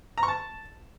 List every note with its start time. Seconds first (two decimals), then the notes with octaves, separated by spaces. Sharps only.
0.18 A#5
0.23 C#6
0.28 A5